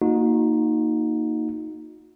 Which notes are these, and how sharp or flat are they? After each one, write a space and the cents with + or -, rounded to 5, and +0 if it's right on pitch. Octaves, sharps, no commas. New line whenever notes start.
A#3 -5 D#4 +0 F#4 -40